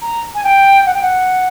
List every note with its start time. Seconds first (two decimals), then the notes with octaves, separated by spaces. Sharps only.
0.02 A#5
0.35 G#5
0.44 G5
0.86 F#5
0.94 G5
1.02 F#5